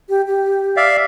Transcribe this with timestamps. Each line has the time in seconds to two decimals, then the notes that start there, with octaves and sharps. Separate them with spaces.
0.09 G4
0.27 G4
0.77 D5 E5 F5